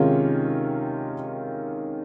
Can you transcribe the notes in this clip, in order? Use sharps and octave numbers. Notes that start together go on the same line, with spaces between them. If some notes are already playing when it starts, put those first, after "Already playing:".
Already playing: C3 D#3 G#3 C#4 F4